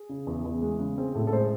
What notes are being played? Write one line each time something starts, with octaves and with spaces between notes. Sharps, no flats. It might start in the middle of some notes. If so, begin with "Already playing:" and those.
Already playing: G#4
C#3
E2
E2
G#3
C#3
C4 G#4
A2 A4
A4
G#3 C5